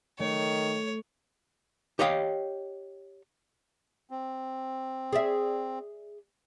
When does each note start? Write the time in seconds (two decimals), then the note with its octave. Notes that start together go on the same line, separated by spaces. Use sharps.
0.20 D#3 A3 C#5
1.99 G4 C#5 D#5 F5 G5
4.10 C4
5.13 G#4 D5 E5